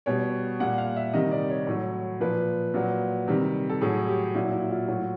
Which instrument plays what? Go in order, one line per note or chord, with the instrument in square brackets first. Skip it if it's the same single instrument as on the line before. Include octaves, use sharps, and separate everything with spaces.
[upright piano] B2 G3 C#5
A#2 G3 F#5
F5
E5
C3 D#3 G3 D#5
D5
C#5
A2 F#3
A#2 F3 B4
A#2 F#3
C3 D#3 G3
A4
A2 F#3 G#4
G4
A#2 F#3 E4
E4
F4
A2 F#3